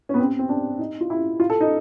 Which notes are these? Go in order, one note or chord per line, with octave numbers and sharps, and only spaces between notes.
C#4
B3
C4
C4
D4
D#4
F4
E4
F4
A4
D#4